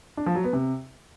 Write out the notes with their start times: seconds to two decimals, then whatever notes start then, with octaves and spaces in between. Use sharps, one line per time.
0.17 D4
0.26 F3
0.35 F#3
0.44 B3
0.53 C3